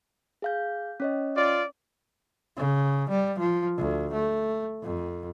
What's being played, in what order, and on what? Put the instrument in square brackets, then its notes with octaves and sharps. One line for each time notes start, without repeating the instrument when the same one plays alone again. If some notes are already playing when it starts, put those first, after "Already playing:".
[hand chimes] G#4 F5 G6
C#4 C#5 D#5
[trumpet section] F4 D5
[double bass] C#3
G3
F3
D2
A3
F2